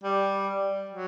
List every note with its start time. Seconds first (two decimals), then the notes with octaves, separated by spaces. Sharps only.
0.04 G3
0.89 F#3